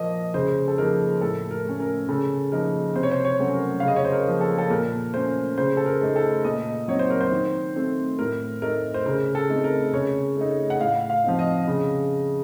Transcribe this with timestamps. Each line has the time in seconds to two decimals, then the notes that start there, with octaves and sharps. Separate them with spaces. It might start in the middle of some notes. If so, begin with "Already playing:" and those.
Already playing: A#2 F3 A#3 D#5
0.34 C#3 C5
0.68 A4
0.78 F3 A#3 D#4 A#4
1.21 A2 A4
1.51 A#4
1.65 A3 C#4
1.80 A#4
2.09 C#3 A4
2.52 F3 A#3 D#4 A#4
2.95 C3 C5
3.03 C#5
3.11 C5
3.25 C#5
3.39 F#3 A3 C#4
3.54 A#4
3.80 C#3 F5
3.88 D#5
3.96 C#5
4.05 C5
4.12 A#4
4.27 F3 A#3
4.41 A4
4.58 A4
4.70 A#2 A#4
5.14 A3 C#4 C5
5.58 C#3 C5
5.77 A4
5.86 A#4
6.01 A3 D#4
6.16 A4
6.44 A#2 D#5
6.88 F#3 C4 D#4 C#5
6.99 C5
7.10 A#4
7.21 C5
7.32 D#3
7.76 A3 C4
8.19 A2 A#4
8.62 A3 D#4 A#4
8.94 C5
9.06 C#3 A#4
9.35 A4
9.49 A3 C4 D#4
9.64 A#4
9.93 C#3 C#5
10.37 A3 D#4
10.70 F#5
10.81 A2 F5
11.10 F5
11.24 F3 C4 D#4
11.39 D#5
11.67 C#3